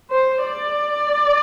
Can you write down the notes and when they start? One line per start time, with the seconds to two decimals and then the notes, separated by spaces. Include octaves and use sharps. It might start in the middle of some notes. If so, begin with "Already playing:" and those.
0.11 C5
0.45 D5